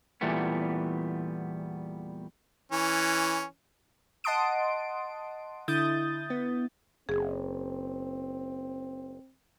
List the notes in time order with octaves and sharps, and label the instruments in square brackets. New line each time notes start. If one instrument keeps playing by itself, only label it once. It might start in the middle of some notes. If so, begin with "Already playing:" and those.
[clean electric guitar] E2 A#2 E3 G3 A3 B3
[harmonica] E3 C#4
[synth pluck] D#5 F#5 A5 C6 D#6 D7
D3 E4 D#6 G6 A6
B3
[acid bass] F#1 [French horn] C4 [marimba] G#4